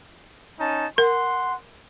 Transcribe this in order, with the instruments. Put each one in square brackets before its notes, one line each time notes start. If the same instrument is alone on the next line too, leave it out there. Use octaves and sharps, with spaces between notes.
[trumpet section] C#4 D#4 A5
[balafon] A#4 [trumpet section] F#5 C6